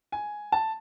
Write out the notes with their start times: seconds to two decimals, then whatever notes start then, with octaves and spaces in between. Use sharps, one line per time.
0.12 G#5
0.52 A5